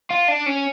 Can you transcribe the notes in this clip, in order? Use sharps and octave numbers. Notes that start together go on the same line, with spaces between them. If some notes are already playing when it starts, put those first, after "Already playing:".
F4
D4
C#4